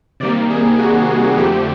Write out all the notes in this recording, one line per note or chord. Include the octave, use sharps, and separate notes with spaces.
C3 D#3 G3 A#3 D5
G#4
F#4
F2 D3 F3 A3 G4